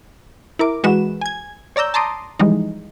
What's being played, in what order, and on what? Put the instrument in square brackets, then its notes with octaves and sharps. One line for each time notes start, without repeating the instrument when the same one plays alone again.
[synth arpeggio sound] E4 A#4 D6
E3 G#3 F#4 B4 E7
G#5 G#6
C#5 D5 A#5 E6 G6
A5 A#5 C6 D6 D#6
E3 F3 G3 G#3 D#4